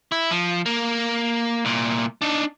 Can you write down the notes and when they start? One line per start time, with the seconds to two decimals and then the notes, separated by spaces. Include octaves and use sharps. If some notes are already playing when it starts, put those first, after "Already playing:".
0.12 E4
0.31 F3
0.66 A#3
1.65 C2 A#2
2.22 D4 D#4